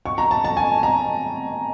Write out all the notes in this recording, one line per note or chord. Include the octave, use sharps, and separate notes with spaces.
C#6
A#5
A5
A5
G#5
A#5